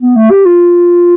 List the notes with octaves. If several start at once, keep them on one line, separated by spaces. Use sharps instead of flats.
B3
A3
G4
F4